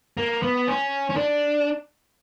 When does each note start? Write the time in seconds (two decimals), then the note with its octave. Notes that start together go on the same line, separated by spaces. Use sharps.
0.17 A#3
0.42 B3
0.67 C#4
1.10 C#4
1.16 D4